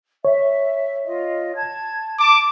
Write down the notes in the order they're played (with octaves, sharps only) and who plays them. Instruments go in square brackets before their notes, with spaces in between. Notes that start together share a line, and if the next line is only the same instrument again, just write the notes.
[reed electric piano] C#5 [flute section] E5
[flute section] F4 D#5
A5 G#6
[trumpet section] A5 D6